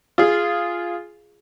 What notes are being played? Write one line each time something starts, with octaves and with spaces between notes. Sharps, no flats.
F4 G#4